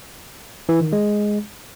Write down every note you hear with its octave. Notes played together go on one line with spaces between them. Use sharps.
E3
D#3
G#3